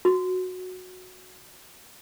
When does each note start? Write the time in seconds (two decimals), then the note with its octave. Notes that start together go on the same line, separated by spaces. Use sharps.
0.05 F#4